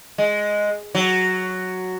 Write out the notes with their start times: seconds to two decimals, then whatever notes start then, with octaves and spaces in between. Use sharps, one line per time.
0.18 G#3
0.95 F#3